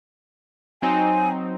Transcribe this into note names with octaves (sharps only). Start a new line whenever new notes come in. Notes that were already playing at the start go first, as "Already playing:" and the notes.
F#3 C4 D#4 G#5